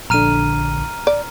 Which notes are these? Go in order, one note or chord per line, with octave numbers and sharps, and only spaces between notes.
A#1 D3 A#5 F6 D#7
D5